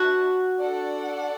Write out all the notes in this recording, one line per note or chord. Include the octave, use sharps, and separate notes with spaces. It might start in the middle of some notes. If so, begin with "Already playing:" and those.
Already playing: D4 F#4 B4 E5 A5
D4 A4 D5 F#5